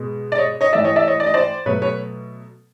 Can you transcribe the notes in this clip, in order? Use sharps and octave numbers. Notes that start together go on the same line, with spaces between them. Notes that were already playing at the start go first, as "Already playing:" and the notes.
Already playing: B2 G#3
D5
C#5 D#5
C#5 D#5
A2 E3 A3 D5 E5
C#5 D#5
D5 E5
C#5 D#5
D5
D#5
C5 D5
B2 F#3 A3 B4 C#5
B4 C#5